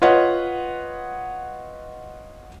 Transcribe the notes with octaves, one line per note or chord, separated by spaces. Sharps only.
F4 B4 C#5 D#5 F#5